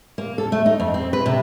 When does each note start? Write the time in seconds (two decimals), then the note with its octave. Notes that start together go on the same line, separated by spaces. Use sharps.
0.18 A#3
0.38 A4
0.52 A3
0.66 D#4
0.80 F2
0.94 C4
1.13 B4
1.26 C3